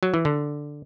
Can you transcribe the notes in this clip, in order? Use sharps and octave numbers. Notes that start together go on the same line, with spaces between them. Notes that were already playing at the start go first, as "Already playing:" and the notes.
F#3
E3
D3